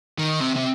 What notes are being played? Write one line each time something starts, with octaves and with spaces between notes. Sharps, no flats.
D#3
C3
C3